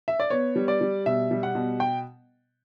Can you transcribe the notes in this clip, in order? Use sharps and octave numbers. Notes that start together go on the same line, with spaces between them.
E5
D5
B3 C#5
G3
D5
G3
B2 E5
G3
F#5
B2
G5